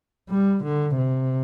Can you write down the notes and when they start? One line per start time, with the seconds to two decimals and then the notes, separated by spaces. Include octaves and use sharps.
0.29 G3
0.64 D3
0.97 C3